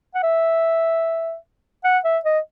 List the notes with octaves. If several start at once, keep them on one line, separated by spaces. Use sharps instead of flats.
F#5
E5
F#5
E5
D#5